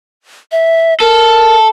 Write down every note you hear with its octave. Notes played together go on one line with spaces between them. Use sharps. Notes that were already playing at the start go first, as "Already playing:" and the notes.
E5
A4 A#4